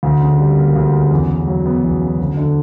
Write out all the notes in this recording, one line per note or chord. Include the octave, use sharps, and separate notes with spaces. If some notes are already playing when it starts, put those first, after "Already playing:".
D2
C#3
G3
A#3
D2
C#3
E2
C#3
F#3
B3
E2
C#3
D2
D3